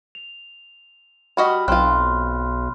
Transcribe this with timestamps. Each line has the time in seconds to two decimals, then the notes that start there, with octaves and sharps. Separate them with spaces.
0.15 F7
1.37 G3 F#4 D#5 B5 F6 B6
1.68 B1 C4 F4 C6 F6 F#6